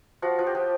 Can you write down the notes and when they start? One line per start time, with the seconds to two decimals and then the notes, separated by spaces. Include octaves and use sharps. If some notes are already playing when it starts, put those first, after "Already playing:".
0.22 F3 F#4
0.39 F3
0.47 G4
0.55 F3